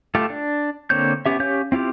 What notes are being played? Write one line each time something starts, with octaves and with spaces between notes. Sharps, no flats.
A3 F4 G4 A4
D4
D3 A#3 C4 C#5 G6
B3 C#4 G4 E5
C#4 G4 C#5 F5 G6
C4 E4 F4 G4